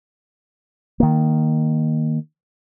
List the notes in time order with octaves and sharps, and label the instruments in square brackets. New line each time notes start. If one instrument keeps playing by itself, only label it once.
[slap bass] D#3 A#3